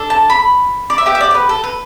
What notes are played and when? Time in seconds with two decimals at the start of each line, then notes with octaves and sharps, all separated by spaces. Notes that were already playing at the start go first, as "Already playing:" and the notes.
Already playing: D4 A4
0.10 A5
0.30 B5
0.90 D5
0.98 E5
1.06 B3 G4 G5
1.15 E5
1.21 D5
1.31 D5
1.35 B4
1.49 A4
1.64 B4